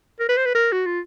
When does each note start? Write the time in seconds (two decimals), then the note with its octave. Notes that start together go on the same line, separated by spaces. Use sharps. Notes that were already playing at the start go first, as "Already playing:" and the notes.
0.20 A#4
0.29 B4
0.37 C5
0.46 B4
0.55 A#4
0.72 F#4
0.86 F4